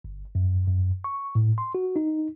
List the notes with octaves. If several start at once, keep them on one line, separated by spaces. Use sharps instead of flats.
G1
F#2
F#2
C#6
A2
C6
F#4
D#4